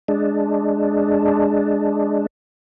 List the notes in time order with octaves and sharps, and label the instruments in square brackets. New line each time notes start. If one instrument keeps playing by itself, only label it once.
[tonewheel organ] G#3 D4